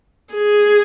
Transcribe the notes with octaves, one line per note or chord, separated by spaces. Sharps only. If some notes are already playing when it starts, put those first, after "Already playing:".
G#4